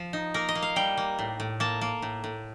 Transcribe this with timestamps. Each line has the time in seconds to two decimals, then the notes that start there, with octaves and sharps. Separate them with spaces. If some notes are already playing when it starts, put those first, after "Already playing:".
Already playing: F3
0.13 D#4
0.34 A#3 A#4
0.49 D#5
0.55 A#3
0.62 F5
0.76 G3 G5
0.97 A#3
1.19 A2
1.40 A2
1.60 A#3 A5
1.81 A#3
2.02 A2
2.24 A2